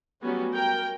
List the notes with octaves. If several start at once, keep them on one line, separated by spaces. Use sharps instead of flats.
F#3 G3 A3 B3 C#4 F#4
A#4 G5